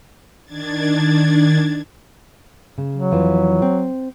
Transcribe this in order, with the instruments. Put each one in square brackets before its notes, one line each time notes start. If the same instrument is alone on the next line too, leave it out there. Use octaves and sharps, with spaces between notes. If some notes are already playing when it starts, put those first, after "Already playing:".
[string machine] D#3 D4 G#6 A6
[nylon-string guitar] C#3
[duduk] F#3
[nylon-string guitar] F2 E3 F4
C4